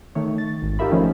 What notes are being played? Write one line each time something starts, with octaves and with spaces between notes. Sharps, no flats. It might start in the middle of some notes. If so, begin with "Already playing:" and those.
D#3 A3 C#5
A6
G#1
D#4 F4 G4 A#4 E5 B5
D#3 F3 A3 C#4